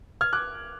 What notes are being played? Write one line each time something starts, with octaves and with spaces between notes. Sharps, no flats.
F6 G#6
D6 F#6